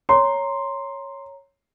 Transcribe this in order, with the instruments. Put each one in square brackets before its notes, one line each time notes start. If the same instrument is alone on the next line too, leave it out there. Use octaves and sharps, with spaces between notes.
[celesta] C#5 A#5 [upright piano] C6